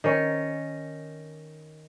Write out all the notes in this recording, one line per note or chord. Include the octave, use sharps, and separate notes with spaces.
D#3 C#4